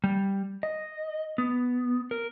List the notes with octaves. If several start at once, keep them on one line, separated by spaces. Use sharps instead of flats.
G3
D#5
B3
A#4